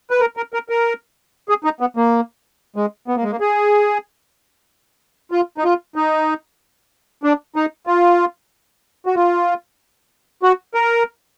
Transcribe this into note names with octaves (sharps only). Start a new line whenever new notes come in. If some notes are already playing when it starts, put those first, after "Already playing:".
B4
A#4
A#4
A#4
A#4
G#4
D#4
B3
A#3
G#3
B3
A#3
G#3
A#3
G#4
F4
D#4
F4
D#4
D4
D#4
F4
F#4
F4
F#4
A#4